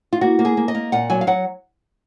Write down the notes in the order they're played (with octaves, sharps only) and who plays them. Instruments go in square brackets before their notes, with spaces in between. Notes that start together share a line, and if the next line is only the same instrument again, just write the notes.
[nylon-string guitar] F4
A#3 F#4
A#3
G#4
A#3
D#5
A#3
A#2 F#5
F#3 G#5
F5
F#3 F#5